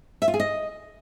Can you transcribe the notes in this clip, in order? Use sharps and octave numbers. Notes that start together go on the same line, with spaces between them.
E5
F4
G#4
D#5